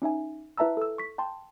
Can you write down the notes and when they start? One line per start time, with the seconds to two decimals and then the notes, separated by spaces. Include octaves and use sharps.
0.02 C#4 D#4 E5 G#5
0.57 E4 B4 E5 A5 A#5 E6
0.77 A4 E6
0.98 C#6 B6
1.18 G5 A5 C6